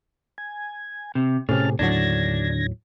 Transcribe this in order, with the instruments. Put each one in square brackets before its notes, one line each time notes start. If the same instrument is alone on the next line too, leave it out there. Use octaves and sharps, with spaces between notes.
[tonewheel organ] G#5
[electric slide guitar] C3
[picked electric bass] A2 C3 [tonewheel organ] C#4 A5 F6 [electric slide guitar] G#4
[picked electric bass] D#2 A2 F#3 [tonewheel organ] D3 G#6 A#6 [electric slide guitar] D4